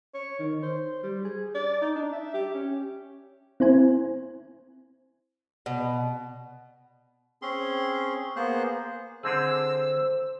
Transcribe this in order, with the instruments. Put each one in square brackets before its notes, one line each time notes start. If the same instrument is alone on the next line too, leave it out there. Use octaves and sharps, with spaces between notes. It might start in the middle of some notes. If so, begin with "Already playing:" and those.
[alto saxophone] C#5
D#3
C5
G3
G#4
D5
D#4
D4
E5
G4
C#4
[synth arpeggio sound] C4 E4 C5 G#5
[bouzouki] B2
[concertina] C4 C#4 G#4 C6
A#3 B3 G#4 C5 F#6
[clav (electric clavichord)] D3 C4 G#4 [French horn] C5 [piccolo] E6